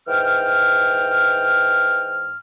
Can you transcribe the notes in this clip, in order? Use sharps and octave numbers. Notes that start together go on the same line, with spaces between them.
G#2 E3 G5 F6